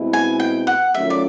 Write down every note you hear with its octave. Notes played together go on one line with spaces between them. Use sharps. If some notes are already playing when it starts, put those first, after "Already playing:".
Already playing: B2 G#3 C4 E4
G#5
G5
F#5
D#3 F#3 A3 C#4 F4 E5
D5